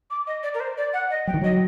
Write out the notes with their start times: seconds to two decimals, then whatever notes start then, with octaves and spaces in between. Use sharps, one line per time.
0.11 D6
0.27 D#5
0.43 D5
0.54 A#4
0.60 C5
0.78 D5
0.93 F#5
1.10 D#5
1.27 F#3 G5
1.34 D#3
1.41 F#3 D#5